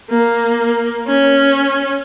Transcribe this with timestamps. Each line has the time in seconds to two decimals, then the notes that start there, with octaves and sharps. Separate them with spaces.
0.10 A#3
1.08 C#4